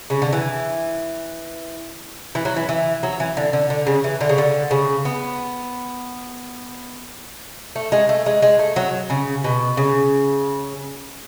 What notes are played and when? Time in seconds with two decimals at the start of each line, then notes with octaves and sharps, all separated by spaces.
0.10 C#3
0.22 D3
0.33 E3
2.35 E3
2.45 F#3
2.56 E3
2.69 E3
3.03 F#3
3.20 E3
3.37 D3
3.53 D3
3.70 D3
3.87 C#3
4.04 E3
4.21 D3
4.29 C#3
4.38 D3
4.71 C#3
5.05 B3
7.75 A3
7.92 G#3
8.09 A3
8.26 G#3
8.42 G#3
8.59 A3
8.76 F#3
9.10 C#3
9.44 B2
9.77 C#3